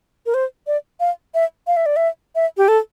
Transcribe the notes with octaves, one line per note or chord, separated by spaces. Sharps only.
A#4
C5
D5
F5
E5
F5
E5
D5
E5
E5
G4
A4